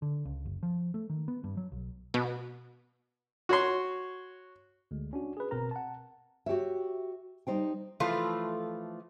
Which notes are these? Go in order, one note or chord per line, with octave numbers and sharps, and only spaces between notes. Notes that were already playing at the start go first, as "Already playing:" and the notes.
D3
C#2
F#1
F3
A3
D#3
B3
G2
F#3
B1
B2
F#4 C#5 C6
D2 G#3
C#4 D4 F#4
G#4 B4
G1 B2 C4 A#4 A#5
F#5 A5
F#4 G4 C#5 E5
G3 D#4 C5 G5
E3 F3 A3 F4